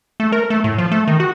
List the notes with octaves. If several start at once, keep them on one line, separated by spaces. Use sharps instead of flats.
A3
A#4
A3
A2
F3
A3
D#3
F#4